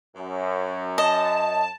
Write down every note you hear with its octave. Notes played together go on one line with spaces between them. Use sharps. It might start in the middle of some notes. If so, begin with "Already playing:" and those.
F#2
D#5 A5